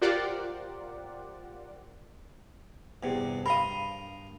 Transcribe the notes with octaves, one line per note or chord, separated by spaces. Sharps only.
F4 G4 A#4 C5 D5 F#5
E2 G2 C3
A#4 F5 B5 C6 D#6